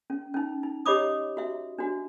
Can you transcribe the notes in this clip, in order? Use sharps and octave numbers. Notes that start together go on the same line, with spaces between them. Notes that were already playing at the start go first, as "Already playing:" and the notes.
C#4
C#4 D#4
D#4
G4 C#5 D#5 B5 D6 D#6
F#4 E5
D4 F#4